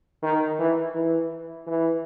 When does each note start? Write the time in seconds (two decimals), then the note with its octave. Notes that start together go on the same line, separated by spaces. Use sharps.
0.23 D#3
0.59 E3
0.95 E3
1.67 E3